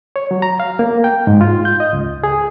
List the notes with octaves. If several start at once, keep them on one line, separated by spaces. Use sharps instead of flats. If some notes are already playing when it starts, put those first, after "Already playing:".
C#5
F#3
A#5
F5
A#3
G5
G#2
F4
G6
D#5
C#2
G#4